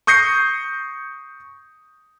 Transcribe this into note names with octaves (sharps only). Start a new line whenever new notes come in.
C#6 D#6 G6 A#6 C7 C#7